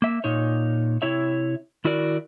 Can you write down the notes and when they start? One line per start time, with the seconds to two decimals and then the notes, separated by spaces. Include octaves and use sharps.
0.02 A#3 E5
0.24 A#2 D#4 C#5
1.02 C3 E4 C#5 E5
1.85 D#3 E4 F#4 A#4 D5